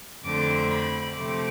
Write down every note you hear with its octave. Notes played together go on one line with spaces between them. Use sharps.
F2 D3 A3 C4 D6
B5
C3 F3 A3 C4 D6